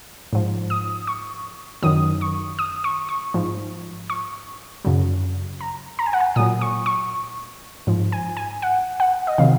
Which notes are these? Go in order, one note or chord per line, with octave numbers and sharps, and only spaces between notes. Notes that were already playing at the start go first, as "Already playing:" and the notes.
G#2 F3
D#6
C#6
F#2 D#3 F#3 D#6
C#6
D#6
C#6
C#6
G#2 F3
C#6
F#2 C#3 F#3
A#5
A#5
G#5
F#5
G#5
A#2 F#3 D#6
C#6
C#6
G#2 F3
G#5
G#5
F#5
F#5
D#5
C3 D#3 F#3 F5